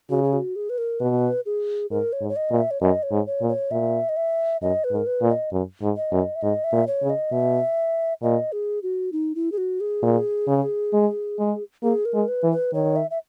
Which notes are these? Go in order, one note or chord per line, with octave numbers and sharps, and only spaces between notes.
C#3 F#4
G#4
F#4
G#4
B4
A#4
B2 B4
G#4
G#2 A#4
C#5
G#2
C#5
D#5
A#2
E5
C#5
F#2 D#5
C#5
G#2
C#5
A#2
C#5
A#2 E5
D#5
E5
F#2 D#5
B4
G#2
A#4
B4
A#2
D#5
F#2
G#2
D#5
F#2
E5
G#2 D#5
E5
A#2
C#5
C#3
D#5
B2 E5
A#2 D#5
G#4
F#4
D#4
E4
G#4
F#4
G#4
A#2
C#3
G#3
G#3
A#3 G#4
A#4
G#3
B4
E3
B4
D#3 C#5
E5
E5